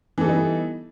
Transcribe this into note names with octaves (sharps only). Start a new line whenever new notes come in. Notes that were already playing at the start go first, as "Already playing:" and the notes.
E3 G3 B3 D#4 A4